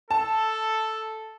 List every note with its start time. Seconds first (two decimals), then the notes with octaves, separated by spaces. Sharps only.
0.11 A4 A5